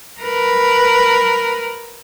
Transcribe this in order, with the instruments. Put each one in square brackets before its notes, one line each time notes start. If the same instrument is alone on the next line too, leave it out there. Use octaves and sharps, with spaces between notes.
[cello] A#4 B4